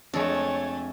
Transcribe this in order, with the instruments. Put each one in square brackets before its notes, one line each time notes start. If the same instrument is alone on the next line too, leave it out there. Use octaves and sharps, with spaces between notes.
[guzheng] F2 [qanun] G#3 D4 [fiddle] A3 G#5 [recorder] C#5